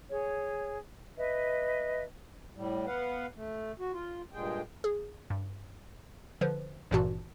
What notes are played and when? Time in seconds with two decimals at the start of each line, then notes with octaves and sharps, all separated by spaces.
0.10 G#4 C#5
1.16 B4 D#5 E5
2.56 A2 G3
2.87 B3 B4 F5 F#5
3.36 A3
3.80 F#4
3.93 F4
4.33 G2 A#2 G#3 G#4 G5
4.84 G#4
5.30 G2
6.41 D3 F3 B4 C5
6.91 G#1 G2 A#2 E3 F#4 A5